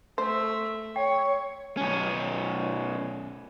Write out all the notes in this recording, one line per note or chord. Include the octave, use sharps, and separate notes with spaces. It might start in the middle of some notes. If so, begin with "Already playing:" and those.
A3 C5 E5
C#5 G5 C#6
B1 C#4